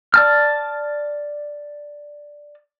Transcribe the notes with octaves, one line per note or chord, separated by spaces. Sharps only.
D5 A5 F6